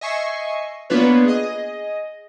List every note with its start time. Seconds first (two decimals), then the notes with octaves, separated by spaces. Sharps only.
0.01 D#5 E5 G#5 C#6 C7
0.90 A#3 B3 D4 F4 B4 C#5
1.25 G#4 D#5